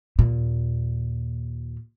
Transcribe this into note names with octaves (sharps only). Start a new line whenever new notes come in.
D#2 A#2